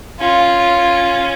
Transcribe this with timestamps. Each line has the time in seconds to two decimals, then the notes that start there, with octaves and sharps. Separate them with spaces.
0.20 C#4 F4